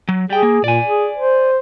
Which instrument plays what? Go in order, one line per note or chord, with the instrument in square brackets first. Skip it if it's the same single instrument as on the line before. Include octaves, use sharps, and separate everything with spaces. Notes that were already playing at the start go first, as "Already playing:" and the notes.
[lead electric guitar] F#3
[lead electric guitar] G3 G5 [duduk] G#4
[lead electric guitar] A#3
[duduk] A#2 [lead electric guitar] D5 G#5
[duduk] G#4
C5